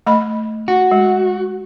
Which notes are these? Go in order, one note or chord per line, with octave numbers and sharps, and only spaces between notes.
A3 D#5 B5
F#4
G#3